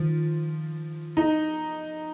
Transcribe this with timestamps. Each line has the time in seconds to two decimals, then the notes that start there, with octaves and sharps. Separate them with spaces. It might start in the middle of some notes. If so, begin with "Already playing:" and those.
Already playing: D#3 F3
1.17 F3 D#4